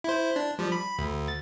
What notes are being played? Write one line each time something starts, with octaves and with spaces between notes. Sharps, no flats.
E4 C5
D4
F3 G3
B5
D2
A6